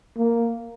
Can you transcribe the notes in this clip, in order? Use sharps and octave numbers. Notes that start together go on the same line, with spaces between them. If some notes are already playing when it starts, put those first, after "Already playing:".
A#3